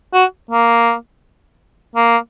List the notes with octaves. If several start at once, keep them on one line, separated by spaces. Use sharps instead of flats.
F#4
A#3
A#3